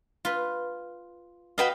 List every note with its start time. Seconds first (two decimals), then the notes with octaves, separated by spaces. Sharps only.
0.25 F4 B4
1.58 F#4 B4 D#5 F5 G5 B5